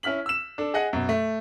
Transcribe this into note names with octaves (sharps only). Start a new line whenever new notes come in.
C#4 E4 F6 B6 F#7
E6 E7
D4 A4
G#4 D#5 F#5
F#2 B2
A3